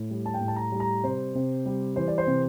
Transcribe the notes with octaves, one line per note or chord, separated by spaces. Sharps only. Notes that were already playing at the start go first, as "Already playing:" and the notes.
Already playing: A2
G3
A5
G5
A2
A5
A#5
G3
A#5
C3 C5
C3
G3
E3 C5
D5
C5
C3